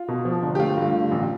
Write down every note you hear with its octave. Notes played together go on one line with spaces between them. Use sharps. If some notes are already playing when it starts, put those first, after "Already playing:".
Already playing: F4
B2
F3
G1
G4
A3 F4
G2
D3
A1